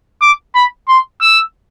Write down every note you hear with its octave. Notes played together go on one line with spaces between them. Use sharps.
D6
B5
C6
E6